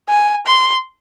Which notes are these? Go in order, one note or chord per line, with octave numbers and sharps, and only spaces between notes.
G#5
C6